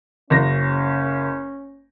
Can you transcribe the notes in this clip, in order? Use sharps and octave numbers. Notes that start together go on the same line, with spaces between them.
F#1 C#4 A#6